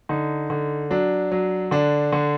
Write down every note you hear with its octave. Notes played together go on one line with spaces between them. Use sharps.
D3 D#4
D3
F#3 D4
F#3
D3 D4
D3